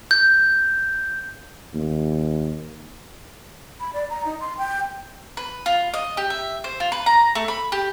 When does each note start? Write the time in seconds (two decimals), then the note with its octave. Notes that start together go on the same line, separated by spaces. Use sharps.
0.11 G6
1.74 D#2
3.80 B5
3.93 D5
4.10 A#5
4.25 D#4
4.41 C6
4.58 G5
5.37 B4
5.66 F4
5.94 D#5
6.17 G4
6.30 E5
6.64 C5
6.80 F4
6.92 B4
7.06 A#5
7.35 A3
7.48 B5
7.72 G4